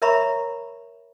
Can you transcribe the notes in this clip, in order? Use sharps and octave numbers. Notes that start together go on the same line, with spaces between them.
A#4 C#5 E5 A#5 B5 C#6